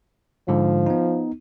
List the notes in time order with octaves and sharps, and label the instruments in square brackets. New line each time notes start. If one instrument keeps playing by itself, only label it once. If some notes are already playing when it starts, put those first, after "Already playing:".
[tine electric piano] G#2 D3 G#3 [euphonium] F3
[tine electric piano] B3 D#4